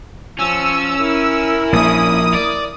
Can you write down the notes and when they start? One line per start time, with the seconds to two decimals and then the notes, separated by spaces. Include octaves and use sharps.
0.39 F3 C#4 E6
1.00 E4 A#4
1.73 A#1 A#3 D#6
2.35 D5